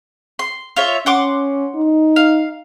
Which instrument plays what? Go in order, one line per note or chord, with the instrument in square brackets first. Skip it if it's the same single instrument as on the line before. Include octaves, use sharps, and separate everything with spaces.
[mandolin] C6
F4 C#5 E5
[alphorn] C#4 [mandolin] F#5 C6 D6
[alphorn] D#4
[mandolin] F5